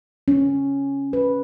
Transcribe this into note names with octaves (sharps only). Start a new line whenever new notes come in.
C#4
B4